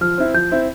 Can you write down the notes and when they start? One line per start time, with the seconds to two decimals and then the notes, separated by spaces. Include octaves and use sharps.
0.01 F3 F6
0.18 C4 E4
0.34 F3 G6
0.52 C4 E4